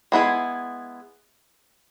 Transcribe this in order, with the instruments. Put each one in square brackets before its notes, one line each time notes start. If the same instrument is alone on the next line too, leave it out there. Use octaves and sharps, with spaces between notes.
[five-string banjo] G#3 B3 E4 G#4